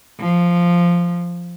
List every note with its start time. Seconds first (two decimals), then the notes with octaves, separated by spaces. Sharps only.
0.20 F3